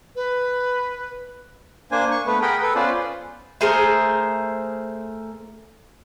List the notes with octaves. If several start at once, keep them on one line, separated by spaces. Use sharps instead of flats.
B4
A#3 D4 C5 G#5
C#6
A3 B3 B4
G#4 A#4 F#5 G5 B5
A4 B4
B3 C#4 F4 B4 C5 D5
A3 G#4 A#4 C5